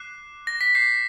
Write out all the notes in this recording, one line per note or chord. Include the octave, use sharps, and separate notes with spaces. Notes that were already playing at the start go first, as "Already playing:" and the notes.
Already playing: D6 F#6 C7
A#6
B6
D6 G6 C7